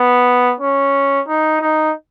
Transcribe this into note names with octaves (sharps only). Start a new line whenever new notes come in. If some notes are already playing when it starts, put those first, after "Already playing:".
Already playing: B3
C#4
D#4
D#4